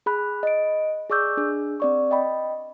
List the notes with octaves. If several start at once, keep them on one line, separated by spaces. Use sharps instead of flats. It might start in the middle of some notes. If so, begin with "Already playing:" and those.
G#4 B5 F#6
D#5 D7
G#4 D5 C#6 D6 E6 G6
D4 G#4
C4 D5 C#6
D#5 G5 B5